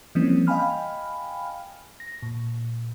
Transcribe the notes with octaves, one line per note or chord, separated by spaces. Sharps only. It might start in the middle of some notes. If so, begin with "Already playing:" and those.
E3 F3 G3 A#3 C4 C#4
D#5 F5 G5 G#5 B5 F6
A#6
A#2